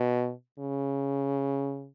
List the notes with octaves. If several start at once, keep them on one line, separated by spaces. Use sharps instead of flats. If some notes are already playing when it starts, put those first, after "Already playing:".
Already playing: B2
C#3